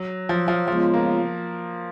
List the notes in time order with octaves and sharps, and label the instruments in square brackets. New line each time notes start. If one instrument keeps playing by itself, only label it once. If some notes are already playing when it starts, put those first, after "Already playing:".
Already playing: [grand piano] F#3
F3
F3
[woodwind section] C#3 G#3 B3 F4 [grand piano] F3
[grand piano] A#3